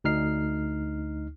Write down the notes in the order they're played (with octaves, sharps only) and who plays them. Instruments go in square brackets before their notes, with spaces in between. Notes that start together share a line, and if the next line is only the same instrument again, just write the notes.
[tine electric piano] D2 D#4 F6 C7